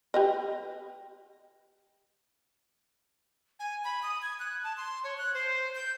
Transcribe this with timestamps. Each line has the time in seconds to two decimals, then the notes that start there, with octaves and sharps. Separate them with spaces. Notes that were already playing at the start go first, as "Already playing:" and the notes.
0.14 G4 B4 D#5
3.60 G#5
3.84 B5
4.03 D#6
4.22 G#6
4.39 F#6
4.64 A5
4.77 C6
5.04 C#5
5.18 F#6
5.34 C5
5.75 G6